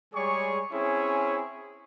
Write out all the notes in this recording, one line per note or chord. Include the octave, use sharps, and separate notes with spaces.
G3 G#3 G#4 C#5 D5 C#6
C4 C#4 E4 G#4 C#5